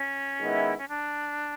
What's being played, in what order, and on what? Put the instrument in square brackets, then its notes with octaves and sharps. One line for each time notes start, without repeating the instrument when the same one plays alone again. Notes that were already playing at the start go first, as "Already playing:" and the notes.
Already playing: [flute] C#4
[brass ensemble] D#3 G#3 B3 E4
[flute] C#4
D4